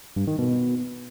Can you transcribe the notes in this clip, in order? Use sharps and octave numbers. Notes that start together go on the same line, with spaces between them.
G2
D#3
B2